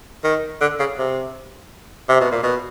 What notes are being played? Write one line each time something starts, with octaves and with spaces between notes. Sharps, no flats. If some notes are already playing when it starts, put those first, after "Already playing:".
D#3
D3
C#3
C3
C3
B2
A#2
B2